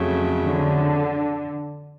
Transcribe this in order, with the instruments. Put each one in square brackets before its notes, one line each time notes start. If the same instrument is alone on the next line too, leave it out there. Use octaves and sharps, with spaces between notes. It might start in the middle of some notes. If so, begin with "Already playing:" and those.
Already playing: [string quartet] F2 C#3 F#3 A3
[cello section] D3